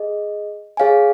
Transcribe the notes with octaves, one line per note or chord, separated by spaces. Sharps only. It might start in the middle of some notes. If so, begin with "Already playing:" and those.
Already playing: G#4 D#5
G#4 C#5 F5 G#5